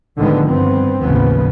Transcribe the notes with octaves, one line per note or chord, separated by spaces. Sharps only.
A2 D3 D#3 F3 G#3 B3
G2 B3 C4
A1 D#2 C#3 F3 B3